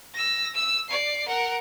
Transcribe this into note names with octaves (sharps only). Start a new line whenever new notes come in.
E6 A#6
E6
D5 C7
A#4 F#5